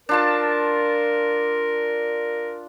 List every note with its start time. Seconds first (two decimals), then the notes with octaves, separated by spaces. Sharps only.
0.09 D4 F4 A#4 A5